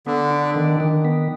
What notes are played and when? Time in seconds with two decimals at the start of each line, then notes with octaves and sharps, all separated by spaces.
0.06 D3 B3
0.31 D4
0.56 D#3
0.80 D#3
1.05 B3